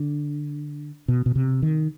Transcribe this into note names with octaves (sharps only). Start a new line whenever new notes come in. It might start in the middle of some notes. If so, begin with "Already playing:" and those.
Already playing: D3
B2
B2
C3
D#3